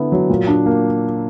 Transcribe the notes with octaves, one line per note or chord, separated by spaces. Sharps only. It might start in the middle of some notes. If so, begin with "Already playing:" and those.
Already playing: D3 B3 E4
F#3
A#2
D4
A#3